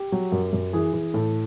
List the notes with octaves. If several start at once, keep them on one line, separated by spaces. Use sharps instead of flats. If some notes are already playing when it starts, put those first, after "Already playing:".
Already playing: G4
F#3
F#2
F#2
E3 G#4
E3
A2 A4